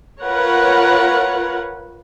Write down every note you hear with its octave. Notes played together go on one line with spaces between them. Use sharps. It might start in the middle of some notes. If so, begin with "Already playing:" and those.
F4 A#4 B4 C#5 F#5